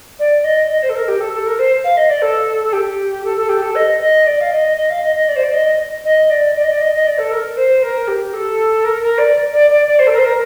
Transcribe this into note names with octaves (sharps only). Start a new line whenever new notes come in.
D5
D#5
D#5
C5
A4
A#4
G4
A4
A4
A#4
C5
F5
D#5
D5
A4
A4
G4
A4
A4
G4
A4
D#5
D#5
D5
F5
D#5
D#5
F5
D#5
D#5
D5
C5
D5
D#5
D#5
D5
D5
D#5
D5
D#5
D#5
D5
A4
A#4
C5
A#4
G4
A4
A#4
A#4
D5
D5
D5
D5
C5
A4
A#4
C5
A#4